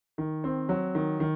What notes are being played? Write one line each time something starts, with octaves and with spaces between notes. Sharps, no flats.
D#3
C4
F#3
D#3
D#3